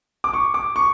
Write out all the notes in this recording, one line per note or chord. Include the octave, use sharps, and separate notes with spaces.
D6
C#6
D6
C#6